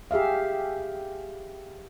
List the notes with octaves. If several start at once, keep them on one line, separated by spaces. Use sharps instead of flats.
G4 G#4 E5 F5